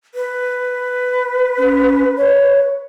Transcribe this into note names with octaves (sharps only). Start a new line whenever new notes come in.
B4
C#4
C#5